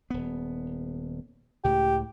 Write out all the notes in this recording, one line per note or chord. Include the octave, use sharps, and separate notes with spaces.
D#1 B3
C#2 A2 C#3 G4